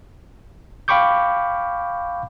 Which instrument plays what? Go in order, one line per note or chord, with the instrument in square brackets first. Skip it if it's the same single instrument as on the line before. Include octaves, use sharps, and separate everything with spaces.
[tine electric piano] F5 G5 B5 C#6 D6 G6